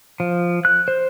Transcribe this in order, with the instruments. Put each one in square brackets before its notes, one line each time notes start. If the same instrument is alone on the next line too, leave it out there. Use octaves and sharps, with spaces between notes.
[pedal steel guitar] F3
F#6
C5